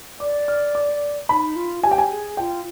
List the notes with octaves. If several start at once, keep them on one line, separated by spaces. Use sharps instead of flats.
D5 D6
F6
D6
D#4 B5
F4
G4 G#5
G5
G#5
G#4
F4 G5